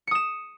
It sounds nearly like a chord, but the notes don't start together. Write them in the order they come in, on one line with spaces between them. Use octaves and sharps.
C#7 D#6 E7